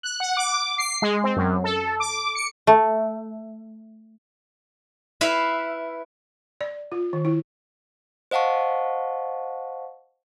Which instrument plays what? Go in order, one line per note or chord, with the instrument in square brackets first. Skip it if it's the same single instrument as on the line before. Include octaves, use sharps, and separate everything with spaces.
[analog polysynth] F#6
F#5
D6
C7
G#3
C4
F#2
A4
D6
C#7
[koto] A3
[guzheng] E4 B4 E5 F5
[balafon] D5
F4
D#3
E4
[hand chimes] C5 D#5 F5 F#5 A5 C#6